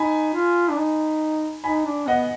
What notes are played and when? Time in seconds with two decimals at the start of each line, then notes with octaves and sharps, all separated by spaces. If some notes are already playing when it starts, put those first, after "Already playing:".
Already playing: D#4 G#5 B5
0.34 F4
0.70 D4
0.78 D#4
1.64 D#4 G#5 B5
1.86 D4
2.08 B3 D#5 F#5